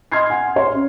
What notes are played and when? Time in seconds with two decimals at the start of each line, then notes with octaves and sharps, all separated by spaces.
0.12 D#5 C6 F6 G#6 C7
0.30 F#5 G#5
0.56 C#5 C6
0.73 C#4